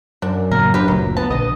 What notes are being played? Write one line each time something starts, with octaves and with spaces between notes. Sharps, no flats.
F#2 D4
A2 C#3 A#3 A#4
D4 G4 B4
F#1 D2 A#2 F#3
B3 A5
A#1 B2 D3 D#5